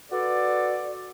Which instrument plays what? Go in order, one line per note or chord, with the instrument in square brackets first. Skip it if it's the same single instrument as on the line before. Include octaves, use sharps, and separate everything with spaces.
[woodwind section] F#4 A4 B4 D5